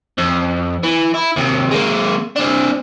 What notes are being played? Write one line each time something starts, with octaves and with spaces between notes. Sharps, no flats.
F2
E3
E4
D#2 C3
G#3 A#3
C4 D4